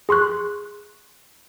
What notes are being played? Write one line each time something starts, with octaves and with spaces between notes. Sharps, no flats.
G#4 C6 C#6 F#6